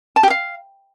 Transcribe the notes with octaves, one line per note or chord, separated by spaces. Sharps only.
A5
G4
F5